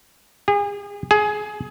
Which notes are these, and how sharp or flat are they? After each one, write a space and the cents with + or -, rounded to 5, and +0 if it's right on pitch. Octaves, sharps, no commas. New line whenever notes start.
G#4 -35
G#4 +20